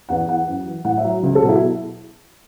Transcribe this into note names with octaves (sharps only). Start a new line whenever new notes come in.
E2 F#5
E3 F#5
F#2
E3
A2 F#5
E5
F#3
C#2
A4
B2 F#3
E4